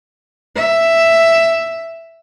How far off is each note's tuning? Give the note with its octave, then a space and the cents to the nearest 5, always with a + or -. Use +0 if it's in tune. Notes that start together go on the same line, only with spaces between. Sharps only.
E5 +5